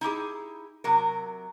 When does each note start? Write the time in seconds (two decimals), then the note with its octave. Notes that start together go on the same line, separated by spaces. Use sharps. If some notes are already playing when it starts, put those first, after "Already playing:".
0.01 D#4 E4 G4 G#4
0.84 C3 F#3 A#4